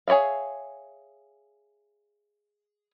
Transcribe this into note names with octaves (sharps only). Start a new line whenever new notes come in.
G#4 C#5 D5 E5 F5